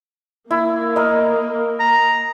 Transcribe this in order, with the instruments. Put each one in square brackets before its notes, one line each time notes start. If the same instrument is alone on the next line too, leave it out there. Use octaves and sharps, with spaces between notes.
[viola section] A#3 [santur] E4
[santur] A#4 D#5
[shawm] A#5